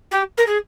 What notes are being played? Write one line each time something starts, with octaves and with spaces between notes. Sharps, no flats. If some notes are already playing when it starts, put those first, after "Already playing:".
G4
A#4
G#4